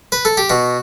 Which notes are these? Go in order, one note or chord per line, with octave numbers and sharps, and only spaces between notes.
B4
A4
G4
B2 F#4